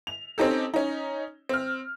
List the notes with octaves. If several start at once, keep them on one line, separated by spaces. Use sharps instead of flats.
F7
C4 C#4 D#4 G4 A4
C#4 D#4
C4 F6